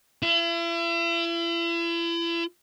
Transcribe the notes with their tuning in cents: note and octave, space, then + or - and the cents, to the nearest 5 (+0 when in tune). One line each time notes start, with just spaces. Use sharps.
E4 +40